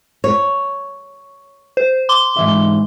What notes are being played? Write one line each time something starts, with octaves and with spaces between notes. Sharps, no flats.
C#5
C5
C6 D6 G7
G#2 E3 E5